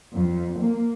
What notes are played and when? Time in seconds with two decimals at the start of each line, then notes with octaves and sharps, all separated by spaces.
0.13 F2
0.59 A#3